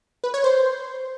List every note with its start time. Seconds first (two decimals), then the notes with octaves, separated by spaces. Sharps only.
0.24 B4
0.34 C#5
0.44 C5